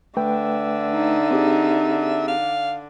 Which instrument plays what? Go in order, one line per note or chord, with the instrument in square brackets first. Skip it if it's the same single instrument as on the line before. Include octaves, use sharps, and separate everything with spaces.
[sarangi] D3 [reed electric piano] A3 B4 G5 [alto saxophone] E5
[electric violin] D#4
[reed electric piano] C4 G4 G#4
[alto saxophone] F5